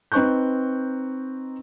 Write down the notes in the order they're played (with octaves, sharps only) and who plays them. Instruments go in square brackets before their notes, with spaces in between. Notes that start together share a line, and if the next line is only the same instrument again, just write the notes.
[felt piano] C4 D#4 B4 C#6 F#6 G6